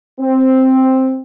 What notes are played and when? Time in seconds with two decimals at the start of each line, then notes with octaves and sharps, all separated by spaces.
0.20 C4